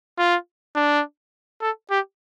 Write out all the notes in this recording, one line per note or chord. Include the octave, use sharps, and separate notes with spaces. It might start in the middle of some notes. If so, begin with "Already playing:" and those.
F4
D4
A4
G4